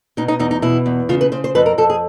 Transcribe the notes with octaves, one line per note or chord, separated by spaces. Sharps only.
B2 D#4
D#4
E2 D#4
D#4
B2 E4
E2
C#3 F4
B4
C#3 C5
C5
F2 B4
A#4
F2 A4
G#4